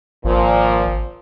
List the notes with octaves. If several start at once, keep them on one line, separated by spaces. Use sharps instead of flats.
G#1 A#2 F3